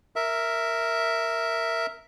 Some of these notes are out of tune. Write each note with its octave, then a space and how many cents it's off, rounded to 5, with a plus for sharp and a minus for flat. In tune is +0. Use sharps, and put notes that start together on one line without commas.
A#4 -10 E5 +0